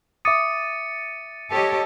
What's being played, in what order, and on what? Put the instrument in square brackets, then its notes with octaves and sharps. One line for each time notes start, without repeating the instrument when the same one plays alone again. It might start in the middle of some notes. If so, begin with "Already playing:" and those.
[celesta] E5 D6 D#6 [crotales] A6 C#7 D#7
[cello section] G4 C#5 D#5 [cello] A4